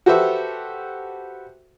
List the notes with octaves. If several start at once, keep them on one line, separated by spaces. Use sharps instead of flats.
F#4 G4 A4 B4 C5 E5